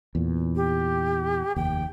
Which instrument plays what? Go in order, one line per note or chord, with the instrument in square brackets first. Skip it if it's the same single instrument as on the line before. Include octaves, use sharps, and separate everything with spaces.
[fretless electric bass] E2 A#2
[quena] G4
[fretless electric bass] F1 D#2 [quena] G5